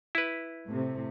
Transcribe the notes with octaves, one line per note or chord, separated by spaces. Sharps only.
E4 B4
A2 C3